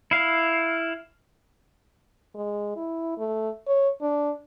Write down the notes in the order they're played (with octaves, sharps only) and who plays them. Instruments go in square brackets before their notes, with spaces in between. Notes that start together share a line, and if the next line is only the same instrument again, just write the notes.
[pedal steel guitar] E4 F5
[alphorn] G#3
E4
A3
C#5
D4